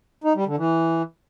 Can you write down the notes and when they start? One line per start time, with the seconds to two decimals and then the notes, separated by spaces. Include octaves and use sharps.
0.24 D#4
0.35 G3
0.46 D3
0.57 E3